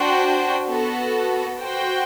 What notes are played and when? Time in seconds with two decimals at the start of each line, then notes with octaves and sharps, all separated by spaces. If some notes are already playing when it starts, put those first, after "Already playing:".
Already playing: D4 F#4 C5 G5
0.68 B3 F#4 A4
1.61 F#4 C5 G5